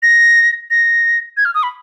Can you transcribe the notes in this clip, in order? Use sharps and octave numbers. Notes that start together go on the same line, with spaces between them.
A#6
A#6
G#6
F6
D#6
B5